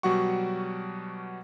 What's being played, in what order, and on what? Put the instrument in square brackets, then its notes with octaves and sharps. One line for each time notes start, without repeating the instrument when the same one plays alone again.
[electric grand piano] B2 F#3 G3 F#4 F#5 C#6